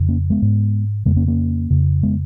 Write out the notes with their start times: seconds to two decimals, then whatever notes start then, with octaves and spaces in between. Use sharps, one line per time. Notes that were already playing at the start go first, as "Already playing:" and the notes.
Already playing: F2 C#3
0.09 A#3 C#4
0.30 G#3 B3
0.42 G#2
1.05 F2 C#3 G#3 B3
1.16 A#3 C#4
1.27 A#3 C#4
1.70 F2 C#3
2.03 G#3 B3